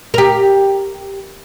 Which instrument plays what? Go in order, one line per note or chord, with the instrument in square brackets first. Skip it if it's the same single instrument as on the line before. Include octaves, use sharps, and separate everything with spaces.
[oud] G4 A#4